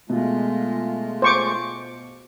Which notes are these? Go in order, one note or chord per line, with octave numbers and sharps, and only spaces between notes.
B2 G#3 A3 F4
C5 C#6 D6